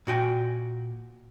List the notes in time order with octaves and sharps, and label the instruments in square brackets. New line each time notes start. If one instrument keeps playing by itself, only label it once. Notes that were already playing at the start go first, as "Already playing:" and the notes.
[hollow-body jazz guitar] A#2 F#4 G5 G#5